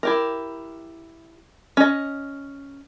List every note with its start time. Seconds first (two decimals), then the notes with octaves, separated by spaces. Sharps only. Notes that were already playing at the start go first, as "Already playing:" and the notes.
0.03 E4 G4 A#4
1.77 C#4 D#5